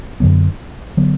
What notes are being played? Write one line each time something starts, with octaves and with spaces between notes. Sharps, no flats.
F#2 D3 F#3 B3
D3 F#3 B3